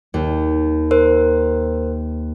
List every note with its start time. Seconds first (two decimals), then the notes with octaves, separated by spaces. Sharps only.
0.14 D#2
0.91 A#4 C5